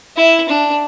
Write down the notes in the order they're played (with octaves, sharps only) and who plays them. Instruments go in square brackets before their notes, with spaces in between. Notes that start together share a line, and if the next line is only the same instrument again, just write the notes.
[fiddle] E4
D4